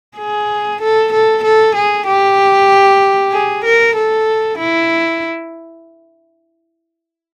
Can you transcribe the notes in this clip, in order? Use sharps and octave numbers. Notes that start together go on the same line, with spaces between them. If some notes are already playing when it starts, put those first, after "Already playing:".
G#4
A4
A4
A4
G#4
G4
G#4
A#4
A4
E4